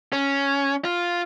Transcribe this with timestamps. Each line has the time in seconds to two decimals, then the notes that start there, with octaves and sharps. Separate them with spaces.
0.13 C#4
0.84 F4